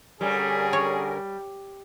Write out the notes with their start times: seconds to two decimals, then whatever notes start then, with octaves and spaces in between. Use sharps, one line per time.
0.21 D3 G3 C#4 G#4 A#4
0.73 C#5